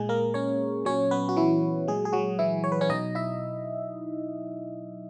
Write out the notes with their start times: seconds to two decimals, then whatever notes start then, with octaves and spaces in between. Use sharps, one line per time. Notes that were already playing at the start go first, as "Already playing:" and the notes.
Already playing: A#2 G#3 G#4
0.09 A#3 A#4
0.34 C#4 C#5
0.85 A#2 F#3 C#4 C#5
1.11 B3 B4
1.29 F#4
1.37 E3 E4
1.88 A#2 F#3 G#3 G#4
2.05 G#4
2.13 F#3 F#4
2.39 E3 E4
2.64 C#5
2.72 B4
2.81 C#4 C#5
2.89 B2 F#3 D#4 D#5
3.15 E4 E5